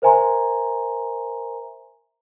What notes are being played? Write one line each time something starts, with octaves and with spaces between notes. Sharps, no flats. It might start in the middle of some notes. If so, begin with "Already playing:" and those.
A#4 C5 E5 G#5 A#5 C6